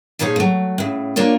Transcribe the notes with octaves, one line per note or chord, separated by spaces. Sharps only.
A#2 F3 D#4 E4 G#4 C#5
F#3 A3
A2 C#3
A#3 D4 F4 C#5